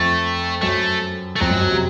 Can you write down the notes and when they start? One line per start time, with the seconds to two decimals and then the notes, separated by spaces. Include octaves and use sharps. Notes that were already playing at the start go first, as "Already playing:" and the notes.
Already playing: F2 A3
0.61 F#2 A3
1.36 A3
1.40 F2 F#3
1.50 F#2
1.61 F#2
1.71 C3